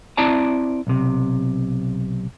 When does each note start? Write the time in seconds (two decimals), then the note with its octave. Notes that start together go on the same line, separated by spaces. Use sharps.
0.17 C4 E4 D5 A5 A#5
0.87 B1 C3